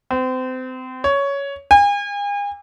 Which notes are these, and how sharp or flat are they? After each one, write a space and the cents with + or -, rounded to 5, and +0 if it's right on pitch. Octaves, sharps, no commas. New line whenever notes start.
C4 -30
C#5 +10
G#5 -40